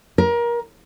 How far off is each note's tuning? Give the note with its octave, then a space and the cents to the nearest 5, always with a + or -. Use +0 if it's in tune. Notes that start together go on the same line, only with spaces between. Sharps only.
A#4 +25